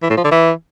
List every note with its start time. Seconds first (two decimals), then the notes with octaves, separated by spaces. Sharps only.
0.03 E3
0.10 A2
0.17 F3
0.24 D3
0.32 E3